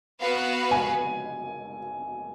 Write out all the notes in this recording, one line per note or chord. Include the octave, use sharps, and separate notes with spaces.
B3 F#4 B4 F5
G#5